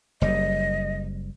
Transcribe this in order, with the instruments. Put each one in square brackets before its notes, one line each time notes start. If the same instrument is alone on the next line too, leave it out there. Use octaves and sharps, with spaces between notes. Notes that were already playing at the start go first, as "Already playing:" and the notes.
[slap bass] F#1 G3 [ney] D#5